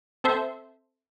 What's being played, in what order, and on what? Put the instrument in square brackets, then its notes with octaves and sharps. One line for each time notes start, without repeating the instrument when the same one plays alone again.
[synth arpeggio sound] C4 A4 C5 E5